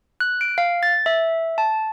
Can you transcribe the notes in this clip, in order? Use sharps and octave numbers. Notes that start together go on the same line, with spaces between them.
F#6
D7
F5
A6
E5
A5